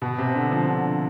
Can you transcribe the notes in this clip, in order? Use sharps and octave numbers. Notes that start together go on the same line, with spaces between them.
B2
C3
D3
F3
D3